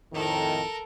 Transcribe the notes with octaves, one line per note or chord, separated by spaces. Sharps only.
F2 A2 D#3 A4 A#4